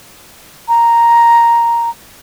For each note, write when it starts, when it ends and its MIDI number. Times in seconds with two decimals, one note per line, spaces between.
0.68 1.89 82